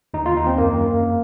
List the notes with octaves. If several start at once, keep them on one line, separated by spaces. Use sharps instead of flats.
D#2 D#4
D#2 F4
D#4
D#3 C4
F#2 A#3
F#2
F#2